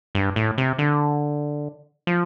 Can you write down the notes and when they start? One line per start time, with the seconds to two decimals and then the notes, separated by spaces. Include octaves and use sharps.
0.15 G2
0.36 A2
0.58 C3
0.78 D3
2.07 F3